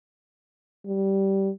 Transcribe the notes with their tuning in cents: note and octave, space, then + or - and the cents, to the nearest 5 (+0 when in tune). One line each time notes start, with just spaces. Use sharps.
G3 -15